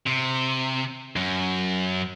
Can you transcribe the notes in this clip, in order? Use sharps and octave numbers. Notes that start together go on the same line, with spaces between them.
C3
F#2